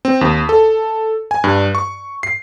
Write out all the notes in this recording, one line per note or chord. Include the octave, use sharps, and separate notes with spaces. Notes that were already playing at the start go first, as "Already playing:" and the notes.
C4
D#2
A4
G#5
G2
C#6
C7